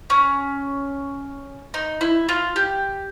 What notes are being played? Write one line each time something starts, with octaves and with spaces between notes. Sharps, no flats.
C#4
D#4
E4
F4
G4